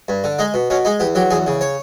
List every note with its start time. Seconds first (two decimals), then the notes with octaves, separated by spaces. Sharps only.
0.08 G2
0.24 D3
0.39 G#3 D#4
0.54 B2
0.70 B2 C#4
0.85 G#3 D#4
1.00 E2 G4
1.15 F#3 G4
1.31 E2 G#4
1.47 C#3
1.61 C#5